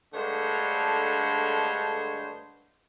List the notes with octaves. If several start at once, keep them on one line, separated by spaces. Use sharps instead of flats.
G2 D3 G#3 A3 C5 C#5